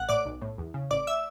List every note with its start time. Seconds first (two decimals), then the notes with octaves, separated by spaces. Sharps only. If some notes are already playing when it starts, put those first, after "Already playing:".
Already playing: A1 F#5 F#6
0.09 A2 D5 D6
0.25 B1
0.41 A2
0.58 E2
0.74 C#3
0.91 A1 D5 D6
1.07 E5 E6